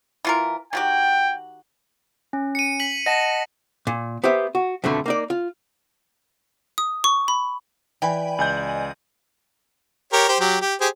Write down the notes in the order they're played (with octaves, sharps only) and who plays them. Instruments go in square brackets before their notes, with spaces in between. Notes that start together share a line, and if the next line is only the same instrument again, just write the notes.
[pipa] E3 F4 A#4
[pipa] D#3 F#4 G4 [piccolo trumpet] G5
[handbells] C#4
[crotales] C#7 D#7
B6 F#7
[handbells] D#5 F#5 A5 [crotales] A#6
[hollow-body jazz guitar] A#2
B3 G4 C5 E5
F#4
F2 B2 D3 A3
A#3 D#4 D5
F4
[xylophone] D#6
C#6
B5
[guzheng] E3 [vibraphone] D5 [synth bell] G5 G#5 B5
[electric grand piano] C#2 G6 [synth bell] D#5 G#5 F#7
[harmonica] G4 A#4 C#5
G4 C5
F#3 G4
G4
G4 G#4 C5